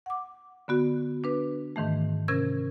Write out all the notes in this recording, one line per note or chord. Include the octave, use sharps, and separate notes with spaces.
F#5 D6
D3 B3 F#4
D4 B4
G#2 D#3 E3 A3
C3 C#4 A#4 G#6